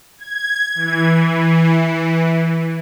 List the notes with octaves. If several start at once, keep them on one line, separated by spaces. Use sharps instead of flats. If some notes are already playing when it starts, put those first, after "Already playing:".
G#6
E3